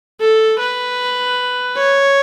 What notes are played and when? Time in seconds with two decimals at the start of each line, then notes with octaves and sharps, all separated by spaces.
0.20 A4
0.60 B4
1.77 C#5